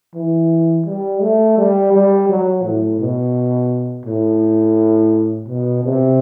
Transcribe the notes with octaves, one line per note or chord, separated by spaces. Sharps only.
E3
G3
A3
G3
G3
F#3
A2
B2
A2
B2
C3